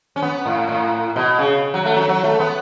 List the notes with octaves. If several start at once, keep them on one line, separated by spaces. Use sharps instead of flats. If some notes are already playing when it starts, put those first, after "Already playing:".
C#4
B3
A2
A2
B2
C#3
F#3
A3
F#3
F#3
A3
B3